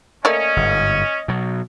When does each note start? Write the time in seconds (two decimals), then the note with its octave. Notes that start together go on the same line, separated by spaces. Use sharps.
0.25 A3 A#3 C#4 D5 D#5
0.57 G1 G#2
1.28 B2 F#3